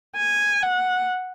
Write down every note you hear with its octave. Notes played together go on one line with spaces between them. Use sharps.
G#5
F#5